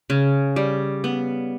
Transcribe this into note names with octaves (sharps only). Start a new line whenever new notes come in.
C#3
G3
B3